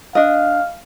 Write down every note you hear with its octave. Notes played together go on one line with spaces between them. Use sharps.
D4 D#5 F5